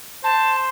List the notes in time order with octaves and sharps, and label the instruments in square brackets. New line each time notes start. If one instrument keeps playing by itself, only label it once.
[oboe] C5 [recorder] A5